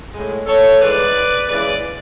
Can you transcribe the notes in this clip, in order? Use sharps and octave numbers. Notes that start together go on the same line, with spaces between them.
A2 G#3
A4 C#5
G#2 E3 G#3 B4 D5
C#3 E3 G#3 B4 D5